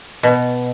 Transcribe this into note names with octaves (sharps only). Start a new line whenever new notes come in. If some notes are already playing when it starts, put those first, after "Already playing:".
B2